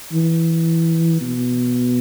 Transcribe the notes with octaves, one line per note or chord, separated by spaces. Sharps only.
E3
B2